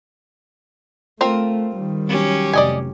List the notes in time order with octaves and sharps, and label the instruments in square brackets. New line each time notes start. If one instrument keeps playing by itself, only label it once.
[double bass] A3 [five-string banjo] C4 F4 A#4
[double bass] D#3 G3
[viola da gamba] F#3 C#4 G4
[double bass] F1 [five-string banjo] D5 D#5 G#5